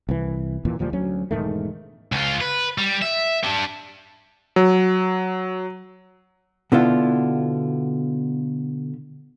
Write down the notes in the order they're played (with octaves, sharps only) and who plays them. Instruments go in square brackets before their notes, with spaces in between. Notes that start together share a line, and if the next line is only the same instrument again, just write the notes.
[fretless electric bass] C2 E3
D#2 A#2 E3
D2 A#2 F3 G3
D2 F#3 C#4
E1 G#2 D#3 A3
[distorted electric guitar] C#2 F4
B4
G3
E5
D4 G4
[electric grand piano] F#3
[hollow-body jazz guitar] B2 D3 B3 E4 F4